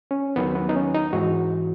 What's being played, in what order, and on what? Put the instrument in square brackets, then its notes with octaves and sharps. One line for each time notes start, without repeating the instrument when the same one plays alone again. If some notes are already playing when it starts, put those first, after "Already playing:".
[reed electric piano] C#4
D#2 D#3 F#3 B3
B3
D#4
C#4
D#4
G#2 E3 F#4